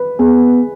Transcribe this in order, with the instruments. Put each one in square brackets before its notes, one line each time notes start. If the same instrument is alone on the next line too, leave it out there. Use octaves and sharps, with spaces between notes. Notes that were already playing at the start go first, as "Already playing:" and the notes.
Already playing: [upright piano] B4
[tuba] B3 [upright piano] G#4